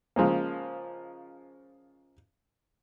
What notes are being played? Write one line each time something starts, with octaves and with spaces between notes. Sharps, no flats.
C#3 F3 G#3 A#3